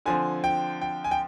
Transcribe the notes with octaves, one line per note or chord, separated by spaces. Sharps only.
D3 F3 C4 G#5
G5
G5
G#5
G5